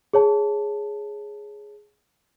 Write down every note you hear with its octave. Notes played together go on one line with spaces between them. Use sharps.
G#4 C#5 A5